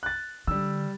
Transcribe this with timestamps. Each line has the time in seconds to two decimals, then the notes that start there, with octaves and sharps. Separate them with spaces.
0.03 F#6 A6
0.47 D3 G3 E6